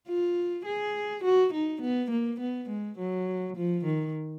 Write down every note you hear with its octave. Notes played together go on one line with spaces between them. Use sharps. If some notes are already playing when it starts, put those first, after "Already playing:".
F4
G#4
F#4
D#4
B3
A#3
B3
G#3
F#3
F3
D#3